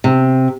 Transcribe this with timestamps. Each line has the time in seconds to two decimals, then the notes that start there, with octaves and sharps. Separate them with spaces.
0.04 C3